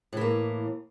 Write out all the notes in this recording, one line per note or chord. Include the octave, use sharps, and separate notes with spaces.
A2 E3 A#3